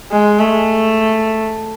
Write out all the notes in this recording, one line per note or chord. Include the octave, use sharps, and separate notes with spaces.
G#3
A3